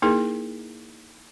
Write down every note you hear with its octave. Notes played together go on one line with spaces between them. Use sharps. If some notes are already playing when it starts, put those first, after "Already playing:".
A#3 D#4 E4 G#4 A#4